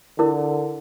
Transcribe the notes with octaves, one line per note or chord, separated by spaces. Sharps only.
D3 E4 A#4